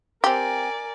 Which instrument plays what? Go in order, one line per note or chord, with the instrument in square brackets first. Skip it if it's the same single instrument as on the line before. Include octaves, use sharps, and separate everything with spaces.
[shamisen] C4 G4 [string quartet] A#4 D5 G#5